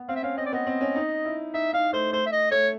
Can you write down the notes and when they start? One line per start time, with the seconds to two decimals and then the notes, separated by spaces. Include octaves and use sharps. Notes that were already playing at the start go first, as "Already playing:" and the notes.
Already playing: B3
0.09 C4 F5
0.16 E5
0.23 C#4 F5
0.37 C4 D#5
0.46 D5
0.52 B3 D#5
0.67 C4
0.81 C#4
0.96 D#4
1.25 E4
1.54 D#4 E5
1.73 D#4 F5
1.93 A3 C5
2.13 A3 C5
2.26 E5
2.32 D#5
2.51 A3 C#5